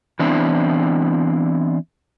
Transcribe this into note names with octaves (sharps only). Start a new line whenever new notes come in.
E3 B3 C4 D4 E4